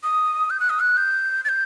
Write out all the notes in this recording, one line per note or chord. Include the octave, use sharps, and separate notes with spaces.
D#6
G6
F#6
D#6
F#6
G6
A6
G6